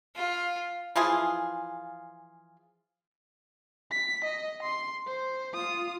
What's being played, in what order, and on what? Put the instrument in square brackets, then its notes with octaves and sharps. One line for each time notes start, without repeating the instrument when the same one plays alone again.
[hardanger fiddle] F4
[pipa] E3 F3 F4 G#4
[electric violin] B6
D#5
C6
C5
F4 D#6